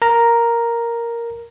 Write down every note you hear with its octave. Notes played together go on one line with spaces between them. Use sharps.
A#4 A#5